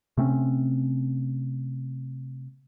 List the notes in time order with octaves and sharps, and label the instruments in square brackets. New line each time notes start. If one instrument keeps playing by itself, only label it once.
[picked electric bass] C3 A3 C4 C#4